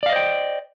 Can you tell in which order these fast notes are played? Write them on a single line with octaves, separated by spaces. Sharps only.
D5 F5 D#5 C5 G5